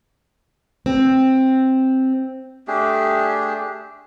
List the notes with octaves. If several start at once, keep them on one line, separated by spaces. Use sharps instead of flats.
C4
A3 D4 G4 G#4